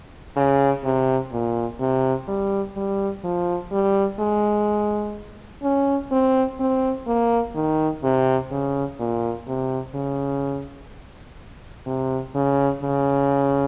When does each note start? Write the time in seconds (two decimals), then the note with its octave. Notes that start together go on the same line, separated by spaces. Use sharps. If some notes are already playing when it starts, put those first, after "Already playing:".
0.36 C#3
0.84 C3
1.33 A#2
1.80 C3
2.28 G3
2.77 G3
3.24 F3
3.72 G3
4.20 G#3
5.63 C#4
6.12 C4
6.60 C4
7.07 A#3
7.55 D#3
8.03 C3
8.51 C#3
9.00 A#2
9.47 C3
9.95 C#3
11.86 C3
12.35 C#3
12.83 C#3